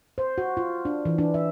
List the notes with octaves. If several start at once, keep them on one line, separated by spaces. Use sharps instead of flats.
C5
F#4
F4
D4
E3
D4
E5